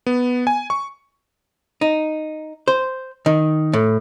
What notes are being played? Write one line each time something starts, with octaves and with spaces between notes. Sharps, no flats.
B3
G#5
C#6
D#4
C5
D#3
A2